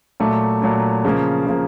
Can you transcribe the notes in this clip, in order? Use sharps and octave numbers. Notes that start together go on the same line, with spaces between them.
A#2 F#3 A3
A#2 F#3 A3
C#3 F3 A#3
C#3 F3 A#3